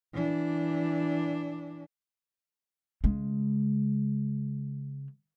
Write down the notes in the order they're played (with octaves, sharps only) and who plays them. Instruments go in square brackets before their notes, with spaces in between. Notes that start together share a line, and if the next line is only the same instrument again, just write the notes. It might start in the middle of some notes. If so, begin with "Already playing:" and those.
[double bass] E3 D4
[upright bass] C#3 G#3